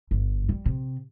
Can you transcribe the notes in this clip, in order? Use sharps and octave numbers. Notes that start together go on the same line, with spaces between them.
G1
G3
C3